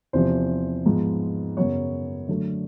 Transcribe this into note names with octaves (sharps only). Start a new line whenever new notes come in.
E2 C3 F3 C5
G#2 F3 G#3 B3
F#2 C#3 F#3 B3 C#5
D3 F#3 A3